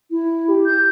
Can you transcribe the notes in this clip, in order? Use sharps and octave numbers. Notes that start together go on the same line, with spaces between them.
E4
G4
G6